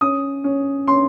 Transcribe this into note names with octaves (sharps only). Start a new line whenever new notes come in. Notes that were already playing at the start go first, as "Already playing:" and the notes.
C#4 D#6
C#4
C#4 C6